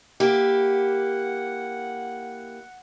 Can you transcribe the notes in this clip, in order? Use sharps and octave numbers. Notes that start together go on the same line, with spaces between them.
A#3 E4 G4 F#5